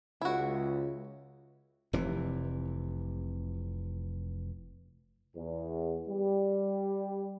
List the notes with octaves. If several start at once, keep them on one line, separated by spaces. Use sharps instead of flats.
C#2 E4 F#4
F1 C3 E3
E2
G3